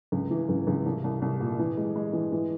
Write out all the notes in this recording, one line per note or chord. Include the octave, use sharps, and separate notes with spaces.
C#2
E3
C#2
C#2
C2
C2
C2
A#2
E3
G#3
G#3
E3
E3